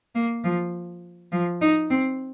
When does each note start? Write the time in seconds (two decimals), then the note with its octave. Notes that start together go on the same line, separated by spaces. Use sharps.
0.15 A#3
0.44 F3
1.32 F3
1.61 D#4
1.90 C4